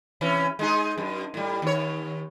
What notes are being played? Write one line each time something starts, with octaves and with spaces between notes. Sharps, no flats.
C3 E3 C#4
G#3 D#4 G#4
F#2
A2 G3
D#2 C#5